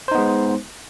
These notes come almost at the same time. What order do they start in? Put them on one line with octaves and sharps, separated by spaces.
C5 D#4 B3 G#3